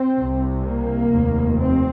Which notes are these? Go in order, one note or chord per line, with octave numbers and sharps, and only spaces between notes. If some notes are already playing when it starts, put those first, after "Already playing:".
Already playing: C4
C2 C3
A#3
F1 D#2
C4